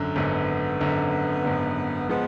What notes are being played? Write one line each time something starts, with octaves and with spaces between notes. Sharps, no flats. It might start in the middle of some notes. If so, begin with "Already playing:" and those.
Already playing: G#1 F#2 D3
G#1 F#2 D3 B3
G#1 F#2 D3
G#1 F#2 D3
F3 G#3 B3